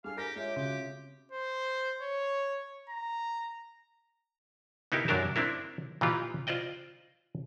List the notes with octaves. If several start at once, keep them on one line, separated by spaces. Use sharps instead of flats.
G3 D4 G#4 A4 F5
G4 A#4 G#5 A#6
G#3 F4 G4 C#5 E5
C#3 C4 F#4 G4
C5
C#5
A#5
B3 D#4 E4 G4 A#4
F#2 F#3 D4 G4 A#4 A5
C4 D4 E4 A#4
A#2 E3 D#4 F4 G4
F4 C5 D5 D#5 G5